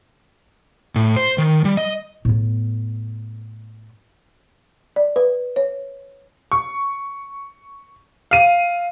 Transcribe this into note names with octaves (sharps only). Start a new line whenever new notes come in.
A2
C5
D#3
G3
D#5
A2 B3
D5
B4
C#5
C#6
F5 D#7